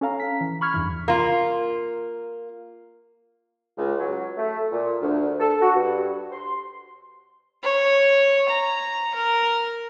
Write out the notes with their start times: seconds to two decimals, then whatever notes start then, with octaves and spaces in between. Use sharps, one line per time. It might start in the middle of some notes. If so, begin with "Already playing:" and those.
0.01 C#4 A4 F5 A#5
0.20 B6
0.41 E3
0.61 B5 C#6 F6 G#6
0.74 E2 G2 E3
1.08 A#3 F4
3.78 C#2
4.00 F#3
4.38 A3
4.72 A#2
5.02 D2
5.40 A4
5.61 F#4
5.75 G2
6.32 C6
7.63 C#5
8.49 A#5
9.15 A#4